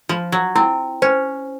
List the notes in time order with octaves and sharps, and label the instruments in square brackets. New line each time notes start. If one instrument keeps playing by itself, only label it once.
[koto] F3 [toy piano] F4
[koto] F#3
[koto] C4 [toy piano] E4
[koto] C#4 [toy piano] C5